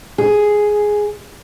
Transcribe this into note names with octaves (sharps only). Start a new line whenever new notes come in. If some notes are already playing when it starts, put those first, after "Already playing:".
G#4